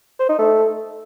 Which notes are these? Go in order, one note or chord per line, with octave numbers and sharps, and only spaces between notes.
C5
D#4
A3